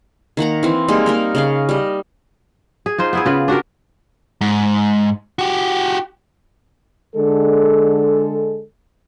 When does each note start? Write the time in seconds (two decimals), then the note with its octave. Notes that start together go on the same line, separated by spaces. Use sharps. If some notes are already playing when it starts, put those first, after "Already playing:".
0.37 D#3 A#3 F#5 A#5
0.63 E3 C4
0.88 G3 G#3 A#3 D#4
1.06 A#3 D#4 A#4
1.35 C#3 D#5 F5
1.69 G3 D#5
2.86 G#4
2.98 D#4 F4 C5
3.13 B3 E4 G#4
3.26 C#3 F4 B4
3.48 D4 F#4 G4 A#4
4.41 G#2
5.39 F#4 G4
7.16 D3 G#3 A4